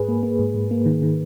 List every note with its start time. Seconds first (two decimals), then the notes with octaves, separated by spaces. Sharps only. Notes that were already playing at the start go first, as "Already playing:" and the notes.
Already playing: G#2 G#4 B4
0.08 A#3
0.23 A#3
0.39 G#2
0.54 G#2
0.71 A#3
0.86 D#3
1.03 D#3